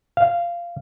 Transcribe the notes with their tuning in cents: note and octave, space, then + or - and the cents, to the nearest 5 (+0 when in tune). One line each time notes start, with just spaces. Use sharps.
F5 -15